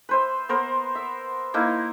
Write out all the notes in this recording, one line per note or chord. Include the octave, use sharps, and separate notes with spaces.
B4 C5 E5
B3 A#4 C5
E5
A#3 D#4 E4